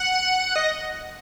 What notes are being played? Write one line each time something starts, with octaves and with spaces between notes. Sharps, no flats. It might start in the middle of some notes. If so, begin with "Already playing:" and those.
Already playing: F#5
D#5